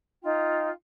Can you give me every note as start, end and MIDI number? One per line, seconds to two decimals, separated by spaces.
0.22 0.67 63
0.22 0.67 65
0.22 0.67 79